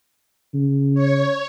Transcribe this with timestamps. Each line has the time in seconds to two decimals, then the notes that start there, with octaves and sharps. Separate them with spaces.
0.54 C#3
0.94 C#5